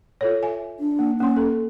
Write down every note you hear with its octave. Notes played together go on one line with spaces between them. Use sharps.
F4 A4 C#5
E5 G#5
D4
A#3
A#3 C#4 C6
A4